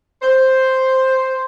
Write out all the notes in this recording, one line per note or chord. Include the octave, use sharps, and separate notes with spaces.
C5